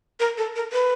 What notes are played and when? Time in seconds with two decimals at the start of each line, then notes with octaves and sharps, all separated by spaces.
0.20 A#4
0.38 A4
0.56 A#4
0.73 B4